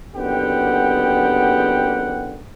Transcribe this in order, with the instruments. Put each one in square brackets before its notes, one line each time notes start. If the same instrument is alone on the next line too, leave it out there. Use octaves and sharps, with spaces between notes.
[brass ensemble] F#1 D3 B3 G4 F#5 G5